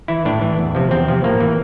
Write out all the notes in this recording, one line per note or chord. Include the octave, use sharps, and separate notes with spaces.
E3 E4
A2 D4
E3
E2
C3 F3
E2 C4
C3 F3
A2 A#3
E3